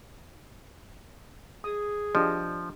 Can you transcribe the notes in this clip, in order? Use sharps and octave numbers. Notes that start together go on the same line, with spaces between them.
G#4 D#6
F3 D4 G4 D#5